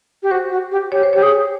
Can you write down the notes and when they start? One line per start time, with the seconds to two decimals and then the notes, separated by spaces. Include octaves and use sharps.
0.23 G4
0.31 F#4 C5
0.51 F#4
0.71 G4
0.92 G4 C#5
1.03 C5
1.13 G4 C#5
1.23 G#4